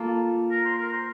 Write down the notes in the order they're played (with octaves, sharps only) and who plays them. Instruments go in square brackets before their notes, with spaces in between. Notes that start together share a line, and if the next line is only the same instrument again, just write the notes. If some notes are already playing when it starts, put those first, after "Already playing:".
Already playing: [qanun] A#3 F4 A4
[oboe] A#4
C5
A#4
C5